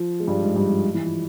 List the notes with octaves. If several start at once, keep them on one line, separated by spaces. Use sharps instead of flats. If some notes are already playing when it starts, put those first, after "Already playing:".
Already playing: F3
G#3
G2 G3
G#2 G#3
G2 G3
F3
E3
F3